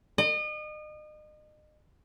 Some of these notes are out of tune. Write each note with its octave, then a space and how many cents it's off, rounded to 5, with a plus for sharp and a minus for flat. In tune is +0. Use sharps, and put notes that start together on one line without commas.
D#5 -35